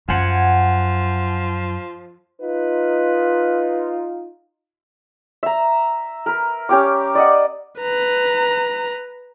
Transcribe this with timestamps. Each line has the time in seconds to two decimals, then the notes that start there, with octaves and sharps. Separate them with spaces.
0.09 F#2 F3 F#5 G#5
2.41 D#4 F4 B4
5.43 E5 A#5
6.26 A#4 B4
6.69 C#4 G4 G5 D6
7.15 D5 D#5 F#5
7.80 B4 A#5